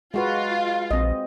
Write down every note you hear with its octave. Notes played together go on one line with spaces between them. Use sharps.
G#3 F4 F#4 B4
A#1 C4 D#5